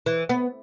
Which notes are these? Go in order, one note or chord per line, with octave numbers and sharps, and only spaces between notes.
E3
B3